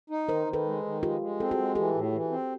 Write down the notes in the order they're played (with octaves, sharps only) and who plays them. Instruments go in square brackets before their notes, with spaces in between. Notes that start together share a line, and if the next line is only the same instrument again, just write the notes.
[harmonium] D#4
[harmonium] D#3 [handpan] A#4 C5
[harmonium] D#3
[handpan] A4 B4
[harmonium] G#3
D#3
[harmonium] G#3 [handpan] F4 G4
[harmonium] G#3
[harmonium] C4 [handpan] A4
[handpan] F#4 G#4
[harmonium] G#3
[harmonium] E3 [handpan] G4 A4
[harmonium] A2
E3
C4